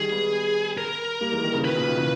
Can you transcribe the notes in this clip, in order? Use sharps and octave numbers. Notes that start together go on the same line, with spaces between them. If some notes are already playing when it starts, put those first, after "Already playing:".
Already playing: D#3 G3 G#4
G#3 B3
A#4
G3 A#3
E3 G#3
D#3 G3
C#3 E3
B2 D#3 B4
A#2 C#3
B2 D#3
C#3 E3